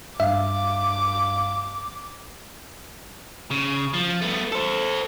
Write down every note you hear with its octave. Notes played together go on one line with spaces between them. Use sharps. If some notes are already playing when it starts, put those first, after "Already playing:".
G2 E5 F5 D6
C#3
F3
A3 B3
A4 C5